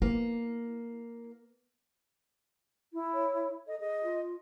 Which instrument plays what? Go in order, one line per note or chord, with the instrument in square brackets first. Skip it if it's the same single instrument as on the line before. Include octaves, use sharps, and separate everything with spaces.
[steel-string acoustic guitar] A#3 [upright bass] E4
[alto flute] E4
[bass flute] C#5
[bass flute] A4 [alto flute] D#5
[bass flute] G#4 [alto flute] D#5
[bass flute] F4